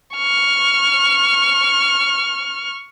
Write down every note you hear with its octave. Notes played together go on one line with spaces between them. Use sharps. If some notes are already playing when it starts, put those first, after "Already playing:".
C#6 F6